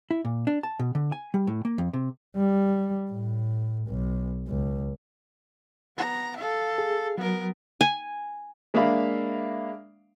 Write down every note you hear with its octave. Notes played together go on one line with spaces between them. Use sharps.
E4
A#2
D4
A5
B2
D3
G#5
G3
A2
A#3
F2
C3
G3
A2
B1
C#2
B3 A#5
A4 F5
G#4
F#3 B3 A#4
G#5
G#3 A#3 D4 E5 F5 B5